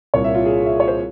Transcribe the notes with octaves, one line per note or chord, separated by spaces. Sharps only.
C2 A#2 G3 C#5
E5
F4
G#4
E5
C#5
C5